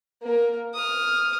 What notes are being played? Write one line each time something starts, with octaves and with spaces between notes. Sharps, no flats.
A#3 A#4
D#6 F6